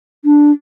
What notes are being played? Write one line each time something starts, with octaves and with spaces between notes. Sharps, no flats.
D4